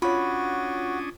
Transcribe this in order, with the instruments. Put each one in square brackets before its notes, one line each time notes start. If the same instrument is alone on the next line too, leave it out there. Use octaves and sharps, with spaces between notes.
[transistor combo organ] C#4 D4 D#6 [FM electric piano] F4 C#5 [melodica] F#4 [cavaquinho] B5